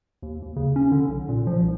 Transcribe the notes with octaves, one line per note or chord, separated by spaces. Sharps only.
D#2
D#2
C#3
C#4
D3
B1
A#2
F3
C2